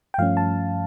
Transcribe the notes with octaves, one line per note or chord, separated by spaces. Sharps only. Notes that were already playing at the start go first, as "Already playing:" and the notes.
G5
G2 F3 A3 C#4 F5
A5